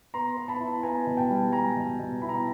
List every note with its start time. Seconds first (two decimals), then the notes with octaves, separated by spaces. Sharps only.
0.14 B3 A#5 C6
0.37 B3
0.48 A5 B5
0.60 E4
0.83 B3 G#5 A#5
1.07 B2
1.17 G5 A5
1.30 G3
1.52 G3 G#5 A#5
1.76 B2
1.99 B2
2.22 E4 B5
2.29 A#5
2.36 A5